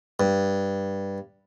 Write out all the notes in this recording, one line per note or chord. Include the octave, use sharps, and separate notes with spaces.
G2